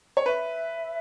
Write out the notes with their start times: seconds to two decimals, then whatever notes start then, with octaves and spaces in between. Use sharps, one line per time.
0.17 C#5
0.26 B4 E5